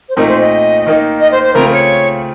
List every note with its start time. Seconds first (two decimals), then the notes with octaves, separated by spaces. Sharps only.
0.09 C5
0.16 A#2 A3 C4 D#4 A#4
0.28 C5
0.41 D#5
0.86 D#3 A#3 D#4
1.20 D#5
1.32 C5
1.43 C5
1.54 C#3 A3 C4 F4 A#4
1.72 C#5